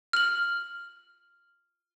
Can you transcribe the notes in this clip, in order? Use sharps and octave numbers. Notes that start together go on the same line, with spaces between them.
F6 F#7